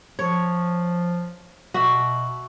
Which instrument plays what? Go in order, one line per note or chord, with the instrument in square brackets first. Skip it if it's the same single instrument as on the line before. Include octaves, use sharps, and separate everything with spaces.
[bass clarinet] F3 [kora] C#5
[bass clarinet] B2 [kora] F#4 E5